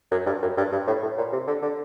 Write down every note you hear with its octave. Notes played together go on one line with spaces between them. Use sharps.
F#2
G2
F#2
G2
G2
A2
A2
A#2
C3
D3
D3